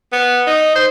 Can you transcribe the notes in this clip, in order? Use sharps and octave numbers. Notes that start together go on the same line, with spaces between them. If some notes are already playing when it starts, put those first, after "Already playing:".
B3
D#4
C5